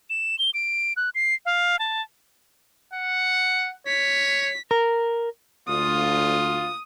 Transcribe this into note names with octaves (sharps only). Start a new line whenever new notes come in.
E7
G7
D7
F#6
C7
F5
A5
F#5
C#5 B6
A#4
D2 F4 D#6